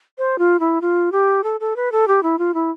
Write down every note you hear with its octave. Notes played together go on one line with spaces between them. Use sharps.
C5
F4
E4
F4
G4
A4
A4
B4
A4
G4
E4
F4
E4